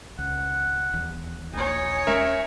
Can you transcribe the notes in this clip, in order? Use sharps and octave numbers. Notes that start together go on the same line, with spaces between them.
C#2 F#5
D#1 E2
D#1 A#1 A#3 D#4 C#5 G#5
D#1 G#3 C#4 A#4 E5